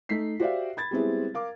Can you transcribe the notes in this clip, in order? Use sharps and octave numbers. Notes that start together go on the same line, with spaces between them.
A3 D#4 B6 C7
F#4 G4 C5 D5 E5 F5
B5 G#6 A6
G3 G#3 B3 C4 E4 G#4
A#4 F5 D6